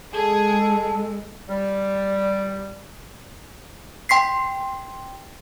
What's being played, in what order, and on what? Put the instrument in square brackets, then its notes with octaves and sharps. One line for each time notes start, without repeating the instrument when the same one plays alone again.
[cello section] G#3 [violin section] G#4 [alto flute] A4 [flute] A5
[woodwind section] G3
[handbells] G5 C6 B6 C7